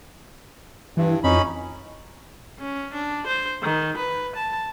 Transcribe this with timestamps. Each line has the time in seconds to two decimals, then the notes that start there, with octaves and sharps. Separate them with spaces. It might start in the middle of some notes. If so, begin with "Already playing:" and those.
0.97 G2 E3
1.24 F2 C#4 D#4 B5
2.59 C#4
2.94 D4
3.27 C5
3.63 D#3
3.97 B4
4.36 A5